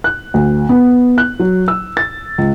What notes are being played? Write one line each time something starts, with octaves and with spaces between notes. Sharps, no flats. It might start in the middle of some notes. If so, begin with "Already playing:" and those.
F#6
D2
B3
F#6
F#3
E6
A6
C#2